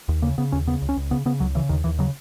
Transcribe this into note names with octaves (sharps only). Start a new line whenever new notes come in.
D#2
C#3 A#3
C#3 B3
D#2 C#4
C#3 B3
C#2
C#4
C#2
C#3 B3
C#3 B3
C#2 F#3
C#3 E3
D#2 D#3
D#2 E3
C#3 F#3